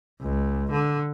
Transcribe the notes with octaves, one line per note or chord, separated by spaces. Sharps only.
C#2
D3